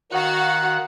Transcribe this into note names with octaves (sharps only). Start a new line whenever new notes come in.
D#3 F#4 F5 F#5 F#6